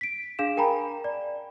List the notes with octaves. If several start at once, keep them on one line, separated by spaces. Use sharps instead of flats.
B6 D7
D4 G#4 F5 E7
A#4 G5 G#5 A#5 B5
D5